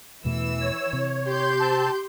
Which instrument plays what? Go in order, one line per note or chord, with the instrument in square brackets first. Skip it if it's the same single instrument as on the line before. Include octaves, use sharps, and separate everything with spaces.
[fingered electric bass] E2 B2 A3 [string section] E3 E6
[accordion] C#5
[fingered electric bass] C3
[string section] G4 C6 G6
[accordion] C4 A5